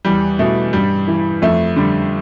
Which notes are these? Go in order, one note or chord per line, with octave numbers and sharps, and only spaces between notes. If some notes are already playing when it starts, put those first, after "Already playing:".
E2 G3
B2 A3
G2 G3
E3
F2 A3
D3 G3